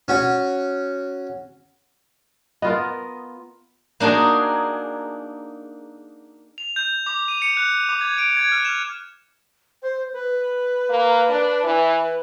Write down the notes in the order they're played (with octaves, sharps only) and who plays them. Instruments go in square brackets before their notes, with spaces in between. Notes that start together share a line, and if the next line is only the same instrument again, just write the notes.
[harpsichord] C#4 F#4
[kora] B3 F4 A#4 [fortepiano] D#5
[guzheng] A#3 D4 D#4 F#4 G#4
[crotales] F7
G6
D6
D#7
C#7
F#6
D6
G#6
D7
G#6
F6
E7
[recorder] C5
B4
[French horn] A#3
D4
E3